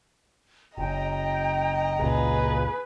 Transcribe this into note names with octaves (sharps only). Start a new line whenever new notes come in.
F#1 D#5 G5 A#5
F#1 C#2 A#2 G#4 B4